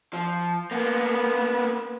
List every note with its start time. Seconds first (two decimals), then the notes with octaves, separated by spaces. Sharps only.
0.13 F3
0.71 A#3 B3